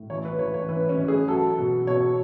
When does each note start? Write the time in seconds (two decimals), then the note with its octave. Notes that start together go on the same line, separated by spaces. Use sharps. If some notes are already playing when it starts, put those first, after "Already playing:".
Already playing: A2
0.10 E3 C#5
0.25 B4
0.39 E3 C#5
0.54 C#5
0.69 E3 B4
0.89 C#4
0.98 E3
1.08 G#4
1.28 F#3 A4
1.58 B2
1.87 B2 C#5